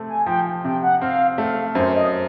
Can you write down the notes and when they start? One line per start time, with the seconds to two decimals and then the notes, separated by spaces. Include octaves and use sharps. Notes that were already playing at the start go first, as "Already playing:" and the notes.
Already playing: C3 A3 C4
0.09 G#5
0.26 F3 G5
0.64 C3 G5
0.82 F#5
1.01 C4 F5
1.38 A3 F5
1.75 F#2 C5
1.94 D#5